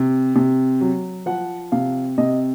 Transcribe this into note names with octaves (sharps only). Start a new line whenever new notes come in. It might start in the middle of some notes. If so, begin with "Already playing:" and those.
Already playing: C3
C3
F#3
F3 F#5
C3 F5
C3 D#5